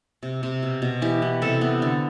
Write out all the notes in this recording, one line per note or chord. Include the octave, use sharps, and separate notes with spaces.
C3
C3
B2
B2
E3 G4
B3
C3 A4
B3
D3